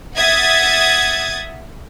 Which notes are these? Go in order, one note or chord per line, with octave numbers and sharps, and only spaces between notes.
E5 F#5 D#6 G#6 A6